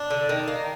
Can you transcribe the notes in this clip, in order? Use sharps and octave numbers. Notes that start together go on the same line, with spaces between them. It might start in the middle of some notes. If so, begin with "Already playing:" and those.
Already playing: D4
D3
D#3
A#3